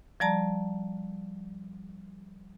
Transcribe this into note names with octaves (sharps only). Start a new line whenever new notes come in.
F3 G3 D5 A5 A#5